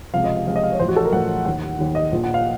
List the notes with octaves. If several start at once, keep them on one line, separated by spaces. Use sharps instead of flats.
C#2 C3 F3 F5
D#5
F5
C#2 C3 F3 F5
D#5
F5
C#5
A1 A2 F3 C5
F#4
A4
A#4
A1 A2 F3 F#5
D#2 D#3 F#5
D#2 D#3
D#5
A#1 A#2 F3
F#5
F5